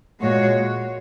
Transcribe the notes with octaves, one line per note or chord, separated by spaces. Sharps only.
A#2 G#3 F#4 C#5